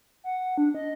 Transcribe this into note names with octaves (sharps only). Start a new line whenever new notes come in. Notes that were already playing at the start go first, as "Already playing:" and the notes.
F#5
D4
D#5